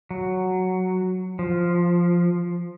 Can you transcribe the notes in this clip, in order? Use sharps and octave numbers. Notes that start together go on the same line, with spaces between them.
F#3
F3